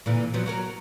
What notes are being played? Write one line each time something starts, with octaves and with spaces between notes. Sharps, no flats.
A#2 D3 E3
F3 F#3 B3
F#3 F#4 A#4